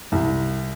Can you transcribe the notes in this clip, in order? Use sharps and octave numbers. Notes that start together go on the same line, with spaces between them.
C2